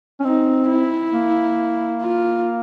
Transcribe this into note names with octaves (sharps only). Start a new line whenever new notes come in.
C#4
C4 D#4
E4
A#3
F4